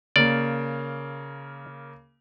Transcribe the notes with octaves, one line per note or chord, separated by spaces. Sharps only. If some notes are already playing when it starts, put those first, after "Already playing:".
C#3 A#3 D5